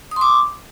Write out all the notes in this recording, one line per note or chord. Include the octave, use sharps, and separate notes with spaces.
C6 D6 D#6